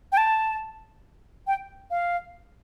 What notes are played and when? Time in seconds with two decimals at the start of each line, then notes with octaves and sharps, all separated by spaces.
0.12 G5
0.17 A5
1.47 G5
1.90 F5